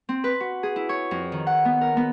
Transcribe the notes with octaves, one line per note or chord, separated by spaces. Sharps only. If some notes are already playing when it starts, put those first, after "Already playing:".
C4
B4
F#4
G#4
E4
C#5
F2
D#3
F#5
B3
A#4
B3